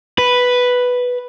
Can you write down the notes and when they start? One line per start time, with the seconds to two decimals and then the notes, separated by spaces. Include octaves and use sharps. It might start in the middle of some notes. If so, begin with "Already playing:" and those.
0.18 B4